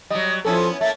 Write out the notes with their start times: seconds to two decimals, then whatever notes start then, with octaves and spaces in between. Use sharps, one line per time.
0.10 F#3 G3 D#5
0.45 F3 B3 C#4 E4 A4
0.81 A3 A#3 E5 A6